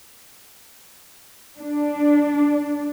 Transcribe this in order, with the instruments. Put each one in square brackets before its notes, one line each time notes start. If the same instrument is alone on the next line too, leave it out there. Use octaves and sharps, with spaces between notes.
[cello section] D4